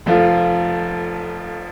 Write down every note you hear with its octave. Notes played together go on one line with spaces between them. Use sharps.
F1 F2 F3 A3 F4